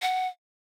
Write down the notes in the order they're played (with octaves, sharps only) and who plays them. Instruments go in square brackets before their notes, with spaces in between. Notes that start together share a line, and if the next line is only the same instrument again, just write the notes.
[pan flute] F#5